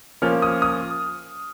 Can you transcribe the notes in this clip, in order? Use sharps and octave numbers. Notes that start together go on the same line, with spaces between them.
F3 A#3 C#4 F6
D#6
D#6